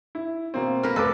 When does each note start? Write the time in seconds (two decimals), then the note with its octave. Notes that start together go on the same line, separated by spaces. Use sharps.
0.15 E4
0.54 B2 A#3 C4
0.83 A#3 A#4 B4
0.96 F1 A4 B4 D6